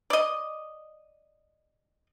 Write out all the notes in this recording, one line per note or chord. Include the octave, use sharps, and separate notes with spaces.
D5 D#5